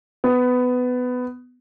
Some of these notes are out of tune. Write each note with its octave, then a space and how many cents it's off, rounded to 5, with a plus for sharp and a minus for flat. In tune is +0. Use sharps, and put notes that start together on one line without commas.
B3 +15